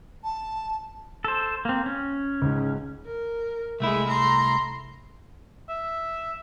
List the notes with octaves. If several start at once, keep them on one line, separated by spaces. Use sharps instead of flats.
A5
A4 C5
A#3 C4
C#4
C#2 G#2
A#4
C2 G#3 A3 E4 E5
A#5 C6
E5